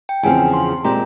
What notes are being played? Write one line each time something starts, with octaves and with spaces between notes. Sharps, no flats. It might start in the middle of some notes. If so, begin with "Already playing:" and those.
G5
E2 C#3 F3 C4 G#5
C6
A#2 G#3 C4 G4 A#5